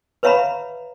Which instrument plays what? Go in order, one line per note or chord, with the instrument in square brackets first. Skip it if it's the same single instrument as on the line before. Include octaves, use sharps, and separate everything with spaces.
[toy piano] B4 C#5 E5 F5 A#5 B5